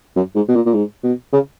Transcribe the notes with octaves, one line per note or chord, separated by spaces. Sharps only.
F#2
G#2
B2
A#2
A#2
G#2
B2
C#3